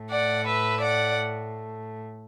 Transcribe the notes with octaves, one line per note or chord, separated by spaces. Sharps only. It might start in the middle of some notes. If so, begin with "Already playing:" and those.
Already playing: A2 A3
D5 F#5
B4 E5
D5 F#5